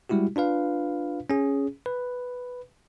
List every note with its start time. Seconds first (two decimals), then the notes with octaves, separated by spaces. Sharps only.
0.09 G3 G#3 E4 F#4 G4
0.36 D4 F4 B4 F5
1.30 C#4 G#4
1.86 B4